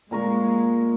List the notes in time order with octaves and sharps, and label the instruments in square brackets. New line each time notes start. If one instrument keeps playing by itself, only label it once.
[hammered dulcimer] A#2 A#4 C#6 [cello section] G#3